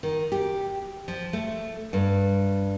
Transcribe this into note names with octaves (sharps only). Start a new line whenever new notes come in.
D#3
G4
F3
A3
G2